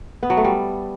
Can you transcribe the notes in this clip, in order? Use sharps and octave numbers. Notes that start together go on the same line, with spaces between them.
B3
F#3
A3
G3